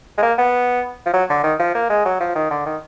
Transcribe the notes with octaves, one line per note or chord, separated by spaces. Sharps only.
G#3
A#3
B3
F3
F#3
D3
D#3
F3
A#3
G#3
F#3
F3
D#3
D3
D#3